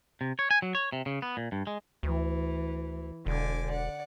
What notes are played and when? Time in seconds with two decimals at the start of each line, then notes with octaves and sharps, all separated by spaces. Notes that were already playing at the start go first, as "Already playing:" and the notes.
0.21 C3
0.39 C#5
0.51 G#5
0.62 F#3
0.75 C#5
0.92 C3
1.06 C#3
1.22 B3
1.37 A#2
1.52 G2
1.67 G#3
2.03 D2 E3
3.26 E1 D3 G#5 D6
3.70 D5 F#5